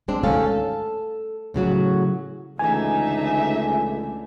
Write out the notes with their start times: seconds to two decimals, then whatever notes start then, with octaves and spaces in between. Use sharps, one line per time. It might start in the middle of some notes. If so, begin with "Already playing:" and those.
0.08 G#3 C4 D4
0.23 D2 G#2 C#4 A4 F5
0.46 A4
1.54 A2 C#3 F#3 F#4
2.59 C#2 D3 E3 A3 D#4 E5 G#5